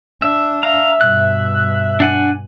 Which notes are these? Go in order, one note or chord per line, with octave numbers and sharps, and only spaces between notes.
D4 E5
E5 F5 A#5
G2 B2 F#6
D4 F#5 G#5